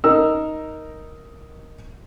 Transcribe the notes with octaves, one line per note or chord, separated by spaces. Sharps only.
D#4 A#4 E6